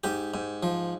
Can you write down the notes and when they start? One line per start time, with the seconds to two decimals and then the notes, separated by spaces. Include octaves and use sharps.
0.04 G#2 G4
0.34 G#2
0.63 F3